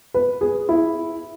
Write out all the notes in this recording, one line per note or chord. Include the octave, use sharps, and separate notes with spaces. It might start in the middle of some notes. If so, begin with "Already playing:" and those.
B4
G#4
E4